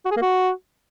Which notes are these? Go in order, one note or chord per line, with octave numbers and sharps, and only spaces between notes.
F#4
G#4
A#3
F#4